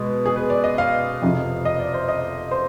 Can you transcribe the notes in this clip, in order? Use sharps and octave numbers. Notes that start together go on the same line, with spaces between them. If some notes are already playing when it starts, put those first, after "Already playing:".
Already playing: B2 G#3 B3
G#4
B4
D5
D#5
F5
F2 C3 F3
D#5
D5
C5
D#5
C5